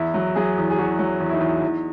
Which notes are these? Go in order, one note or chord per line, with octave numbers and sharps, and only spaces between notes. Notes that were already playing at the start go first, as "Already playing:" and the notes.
Already playing: E2 E4
F#3
F#3 G#4
E2
G#4
E2 F#4
F#3
E2
E4
D#4
E2
E2